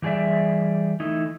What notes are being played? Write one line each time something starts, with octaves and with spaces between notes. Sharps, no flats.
E3 G3 G#4 C#5 D5 E5
E3 A3 D#4 E4